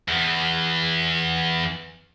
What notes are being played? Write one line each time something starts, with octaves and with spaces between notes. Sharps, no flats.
E2 E3